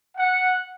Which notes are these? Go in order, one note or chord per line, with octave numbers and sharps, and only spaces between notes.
F#5